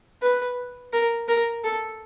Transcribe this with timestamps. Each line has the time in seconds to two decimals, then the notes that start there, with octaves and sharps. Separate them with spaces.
0.22 B4
0.93 A#4
1.28 A#4
1.64 A4